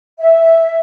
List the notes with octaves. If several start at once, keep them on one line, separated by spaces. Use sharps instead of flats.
E5